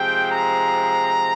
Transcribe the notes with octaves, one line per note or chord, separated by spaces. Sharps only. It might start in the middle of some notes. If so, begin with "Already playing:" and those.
Already playing: C3 F3 G#3 G5
A#5